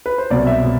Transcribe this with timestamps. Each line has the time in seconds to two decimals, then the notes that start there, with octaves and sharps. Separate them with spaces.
0.06 B4
0.18 C5
0.30 C2 B2 F#3 D5
0.47 E5
0.64 B2